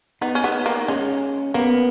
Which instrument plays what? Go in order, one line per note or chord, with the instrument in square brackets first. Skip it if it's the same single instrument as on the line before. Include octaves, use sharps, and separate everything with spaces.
[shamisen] B3 [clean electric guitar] D#4
[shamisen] C#4
B3
A#3
[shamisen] G#3 [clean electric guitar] C#4
[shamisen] A#3 [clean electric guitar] B3